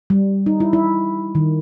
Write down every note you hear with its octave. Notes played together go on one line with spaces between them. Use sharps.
G3
D#4
E4
E4
D#3